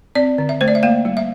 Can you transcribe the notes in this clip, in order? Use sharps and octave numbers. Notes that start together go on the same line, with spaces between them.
C4 D5
D3
E5
A3 C5
D5
E5
A#3 F5
G3
E5